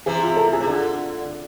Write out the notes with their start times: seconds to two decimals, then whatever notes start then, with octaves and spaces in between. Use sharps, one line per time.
0.06 C3 E3 G#4
0.22 F4
0.36 A4
0.53 G#4
0.60 C3
0.67 D3 F4